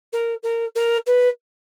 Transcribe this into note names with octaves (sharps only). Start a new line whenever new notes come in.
A#4
A#4
A#4
B4